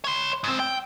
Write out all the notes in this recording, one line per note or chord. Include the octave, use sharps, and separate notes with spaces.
C#5 C6
G#2 C4
G5